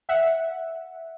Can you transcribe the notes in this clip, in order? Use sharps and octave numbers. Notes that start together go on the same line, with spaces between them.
E5 F#5